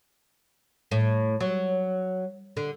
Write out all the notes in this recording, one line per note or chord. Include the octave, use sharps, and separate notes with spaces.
A2
F#3
D3